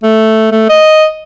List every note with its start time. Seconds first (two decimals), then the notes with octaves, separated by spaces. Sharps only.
0.03 A3
0.52 A3
0.69 D#5